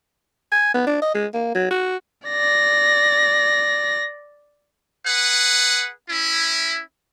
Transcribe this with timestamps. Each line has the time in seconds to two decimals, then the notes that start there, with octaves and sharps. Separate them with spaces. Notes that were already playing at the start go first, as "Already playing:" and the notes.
0.52 G#5
0.74 B3
0.87 D4
1.02 D#5
1.14 G#3
1.34 A#3
1.55 F#3
1.71 F#4
2.28 D5 A#6
5.05 G#4 B4 F#5
6.09 C#4 E4